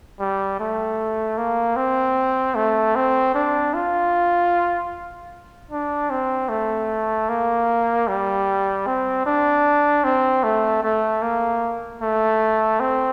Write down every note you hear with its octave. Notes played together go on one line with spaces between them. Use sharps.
G3
A3
A#3
C4
A3
C4
D4
F4
D4
C4
A3
A#3
G3
C4
D4
C4
A3
A3
A#3
A3
C4